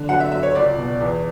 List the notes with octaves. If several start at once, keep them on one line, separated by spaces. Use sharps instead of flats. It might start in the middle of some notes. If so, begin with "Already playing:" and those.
Already playing: D3
F#3 F#5
E5
F#3 E5
C#5
C#2 D5
B2
E2